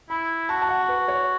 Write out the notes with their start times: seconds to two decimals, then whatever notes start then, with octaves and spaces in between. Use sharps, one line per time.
0.10 E4 B5
0.49 F#4 A5
0.62 A5
0.69 F#5
0.89 B4
1.08 C#5